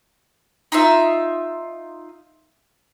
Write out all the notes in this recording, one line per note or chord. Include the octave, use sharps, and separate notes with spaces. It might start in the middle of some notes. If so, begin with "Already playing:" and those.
D#4 F4 E5